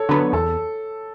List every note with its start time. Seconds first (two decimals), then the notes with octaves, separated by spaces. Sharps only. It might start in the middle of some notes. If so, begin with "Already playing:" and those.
Already playing: A4 C#5
0.09 D3 F#3 B3
0.33 E2 A4